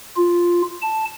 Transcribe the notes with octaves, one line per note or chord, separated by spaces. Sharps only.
F4
A5